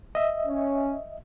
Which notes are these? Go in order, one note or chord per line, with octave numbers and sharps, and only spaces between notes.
D#5 E5
C#4